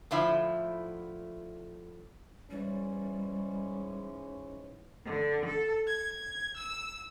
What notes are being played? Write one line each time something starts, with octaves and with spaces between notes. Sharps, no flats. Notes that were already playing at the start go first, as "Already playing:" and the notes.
A2 D3 F3 E4 E5
G#2 E3 G3 C#4
D3
A4
G#6
E6